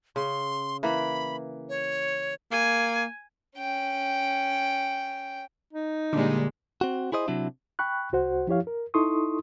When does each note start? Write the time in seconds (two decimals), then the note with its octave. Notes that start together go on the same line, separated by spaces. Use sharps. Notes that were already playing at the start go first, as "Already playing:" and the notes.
0.16 C#3 C6
0.83 E3 A#3 B5
1.69 C#5
2.51 A#3 G#5
3.57 C#4 G5
5.73 D#4
6.13 A#2 D3 G3 G#3
6.81 C4 F#4
7.12 E4 G#4 C5 D#5
7.28 C3 F#3 D4 E4
7.79 G5 B5 C#6 F#6
8.12 C2 F#4 C5 F#5
8.47 F3 E4 G4 C#5 F5
8.67 A#4
8.94 D#4 E4 A4 C6 C#6 D#6